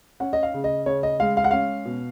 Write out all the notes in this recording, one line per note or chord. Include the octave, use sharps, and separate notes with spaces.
C#4 F#5
D#5
F5
C#3
D#5
C#3 C#5
D#5
G#3 F5
F5
F#5
C#4 F5
B2